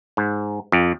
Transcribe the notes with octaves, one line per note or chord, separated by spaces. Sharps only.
G#2
F2